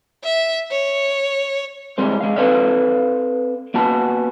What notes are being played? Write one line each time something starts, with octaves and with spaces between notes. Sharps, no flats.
E5
C#5
G3 G#3 C4 C5
G#3 F5
C4 A4 B4 C5 D5 F5
A#3 B3 F#4 A5